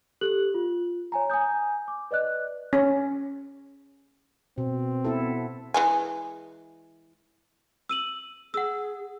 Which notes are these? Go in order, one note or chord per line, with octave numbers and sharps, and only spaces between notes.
G4 A4 F#6 F#7
F4
C#5 G#5 A#5
G#5 A#5 D#6 G6
D6
B4 D5 D#5 F#6
C#4
B2 C4
B3 E4 A4
E3 G#3 G#5
E6 D#7 F#7
G#4 F#5 E6